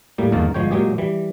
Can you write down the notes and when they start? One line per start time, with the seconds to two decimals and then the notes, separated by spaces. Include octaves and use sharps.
0.18 A2 G3 A#3
0.32 G1 E2 D#3 A#3 A#4 A5
0.54 G1 F3 G#3 C#5 G5
0.71 A#2 F#3 G#3 G4 G#4
0.98 E3 G3